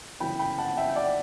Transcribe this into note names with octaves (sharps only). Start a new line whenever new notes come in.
G1 F#2 C#3 E3 G5 B5
G5 B5
F#5 A5
E5 G5
G5
D5 F#5